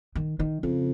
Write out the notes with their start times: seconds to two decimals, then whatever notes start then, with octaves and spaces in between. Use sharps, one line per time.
0.15 D#3
0.40 D#3
0.63 F2 C#3